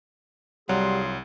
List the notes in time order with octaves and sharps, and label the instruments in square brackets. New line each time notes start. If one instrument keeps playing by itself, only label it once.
[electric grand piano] C2 [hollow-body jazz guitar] F#3 [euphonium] G3 [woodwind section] F4 G#4 C6